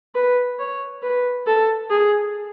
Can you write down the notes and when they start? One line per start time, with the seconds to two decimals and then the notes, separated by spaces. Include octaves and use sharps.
0.15 B4
0.59 C#5
1.02 B4
1.47 A4
1.90 G#4